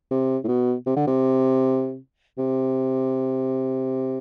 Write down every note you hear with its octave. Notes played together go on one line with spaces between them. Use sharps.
C3
A2
B2
C3
D3
C3
C3